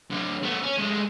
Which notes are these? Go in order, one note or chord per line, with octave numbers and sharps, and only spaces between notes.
D3 F#3
A3 B3
C#4
G#3 A3